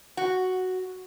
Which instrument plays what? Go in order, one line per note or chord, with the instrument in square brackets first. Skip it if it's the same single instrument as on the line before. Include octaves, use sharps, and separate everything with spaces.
[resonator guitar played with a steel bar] F#4